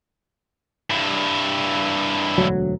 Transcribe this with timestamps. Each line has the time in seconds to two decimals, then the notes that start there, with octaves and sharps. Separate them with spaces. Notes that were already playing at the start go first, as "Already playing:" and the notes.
0.90 G2 E4
2.38 E1 D2 F#3